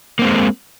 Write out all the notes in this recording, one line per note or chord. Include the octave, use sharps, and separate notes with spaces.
G#3 A#3 C4